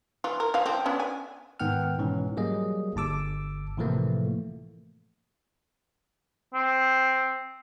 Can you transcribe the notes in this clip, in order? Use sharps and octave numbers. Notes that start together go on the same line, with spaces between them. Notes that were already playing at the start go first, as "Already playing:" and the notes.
E3 F4
A#4
E3 F3 F5
F3 C4
B3 C#4 D4
G#5
G#2 D#3 B3 F#5 G5 F6
G#2 B2 E3 C#4
F#3 G3 A#3 G#4 D#5
G1 A5 D6 E6
A2 C3 E3 F3 A3 A#3
C4